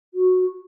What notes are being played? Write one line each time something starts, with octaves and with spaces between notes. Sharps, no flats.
F#4